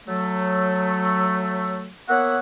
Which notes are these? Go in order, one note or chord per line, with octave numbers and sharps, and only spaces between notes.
F#3 A3
A#3 B3 C#5 E5 F#5